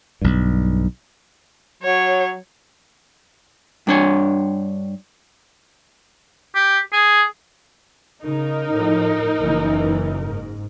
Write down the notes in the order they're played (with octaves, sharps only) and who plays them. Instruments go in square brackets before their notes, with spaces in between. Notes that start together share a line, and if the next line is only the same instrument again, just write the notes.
[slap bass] B1 G2
[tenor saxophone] F#3 [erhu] C#5
[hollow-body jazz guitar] G2 D4 C#5
[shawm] G4
G#4
[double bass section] C#3 [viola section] D#4 A#4
[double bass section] A2 F3
F#1 E3
G#2